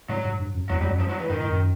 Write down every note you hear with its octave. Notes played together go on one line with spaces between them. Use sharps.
A2 F#3
G#2
G2
F#2
E2 F#3
F2 G3
F#3
F#2
F3
F#3
E3
G2 D#3
A2
F#2